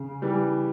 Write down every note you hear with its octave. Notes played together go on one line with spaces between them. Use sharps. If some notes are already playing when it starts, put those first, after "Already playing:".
Already playing: C#3
E3 G3